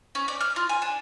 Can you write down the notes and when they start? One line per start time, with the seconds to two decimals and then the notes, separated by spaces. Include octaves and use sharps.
0.15 C#4
0.28 D5
0.41 F6
0.56 F4
0.69 G#5
0.82 D4